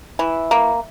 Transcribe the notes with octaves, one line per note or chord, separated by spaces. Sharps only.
E3
A#3